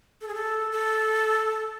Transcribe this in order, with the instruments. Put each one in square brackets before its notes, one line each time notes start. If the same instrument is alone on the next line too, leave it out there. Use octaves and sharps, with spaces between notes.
[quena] A4
G#4
A4
A4